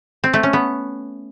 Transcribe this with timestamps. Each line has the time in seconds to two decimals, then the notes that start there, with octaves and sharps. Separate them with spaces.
0.24 C4
0.33 A3
0.43 C#4
0.53 B3